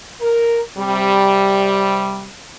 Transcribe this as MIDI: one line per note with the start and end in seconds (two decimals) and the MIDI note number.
0.21 0.60 70
0.77 2.29 48
0.77 2.29 55